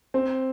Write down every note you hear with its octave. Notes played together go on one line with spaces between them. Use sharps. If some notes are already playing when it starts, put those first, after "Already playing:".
C4